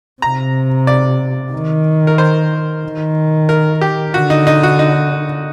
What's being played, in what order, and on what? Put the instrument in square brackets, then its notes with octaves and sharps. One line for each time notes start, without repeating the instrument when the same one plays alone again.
[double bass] C3 [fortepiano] A#5
[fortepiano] D5
[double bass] D#3
[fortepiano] A#4
C5
[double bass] D#3
[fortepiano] A#4
G4
[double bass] D3 [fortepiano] F#4
[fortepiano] D#4
D#4
F#4
D#4